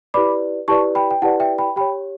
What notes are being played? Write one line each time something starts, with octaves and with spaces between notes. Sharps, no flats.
E4 G4 B4 D5 B5 D6
E4 G4 B4 D5 A5 C#6
G5 B5
G5
E4 G4 B4 D5 F#5 A5
E5 G5
G5 B5
G4 C#5 G5 B5